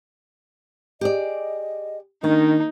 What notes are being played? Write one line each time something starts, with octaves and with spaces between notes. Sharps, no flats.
G4 G#4 D5 D#5
D#3 A#3 D4 D#4